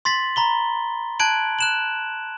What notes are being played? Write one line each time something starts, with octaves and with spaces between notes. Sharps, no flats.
C6 A6 B6 F#7
A#5 B5 G7
A5 F#6 G#6 D7 F#7
F#6 E7 F#7